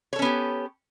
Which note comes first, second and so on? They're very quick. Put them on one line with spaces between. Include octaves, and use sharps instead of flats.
C#5 A4 C#4 B3 G4